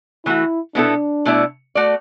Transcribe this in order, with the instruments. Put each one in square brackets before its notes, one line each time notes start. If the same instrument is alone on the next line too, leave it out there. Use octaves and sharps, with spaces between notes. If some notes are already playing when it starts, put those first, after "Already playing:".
[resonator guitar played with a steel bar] E3 A3 F#4 [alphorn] E4
[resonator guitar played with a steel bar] B2 B3 E4 A4 [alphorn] D4
[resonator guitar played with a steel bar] B2 A3 E4 D5
A3 F#4 D5